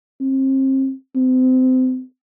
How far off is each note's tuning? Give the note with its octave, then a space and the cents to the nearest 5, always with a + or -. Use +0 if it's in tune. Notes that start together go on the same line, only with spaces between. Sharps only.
C4 +35
C4 -30